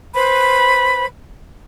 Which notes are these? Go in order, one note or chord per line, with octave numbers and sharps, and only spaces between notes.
B4 C5 B5